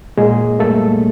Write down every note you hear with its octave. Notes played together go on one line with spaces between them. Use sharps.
A#2 G#3 G#4
G3 A3 A#3 A4